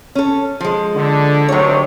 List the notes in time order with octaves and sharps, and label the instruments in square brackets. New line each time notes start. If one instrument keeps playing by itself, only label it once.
[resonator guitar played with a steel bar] C#4 A4
F3 G#3
[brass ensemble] D3
[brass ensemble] D2 C3 D#3 [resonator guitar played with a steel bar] F#3 C#5